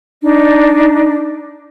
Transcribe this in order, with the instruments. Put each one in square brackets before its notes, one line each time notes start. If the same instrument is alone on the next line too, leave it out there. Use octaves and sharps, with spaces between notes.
[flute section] D4 D#4